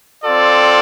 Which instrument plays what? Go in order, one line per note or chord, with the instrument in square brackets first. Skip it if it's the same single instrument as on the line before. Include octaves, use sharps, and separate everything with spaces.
[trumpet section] C4 F4 A4 D5